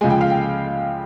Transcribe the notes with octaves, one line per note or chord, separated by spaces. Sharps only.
C#2 C#3 F3 G#3 G#5
G5
F5
G5